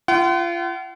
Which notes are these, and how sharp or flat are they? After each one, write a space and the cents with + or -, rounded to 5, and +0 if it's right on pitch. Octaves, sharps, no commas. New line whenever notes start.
F4 -30 F#5 +40